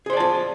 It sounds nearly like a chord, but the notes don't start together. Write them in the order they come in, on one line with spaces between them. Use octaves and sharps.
G#4 C5 D5 A5 F4